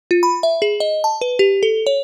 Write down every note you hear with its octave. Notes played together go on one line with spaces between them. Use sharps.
F4
B5
E5
G#4
D#5
A5
B4
G4
A4
C#5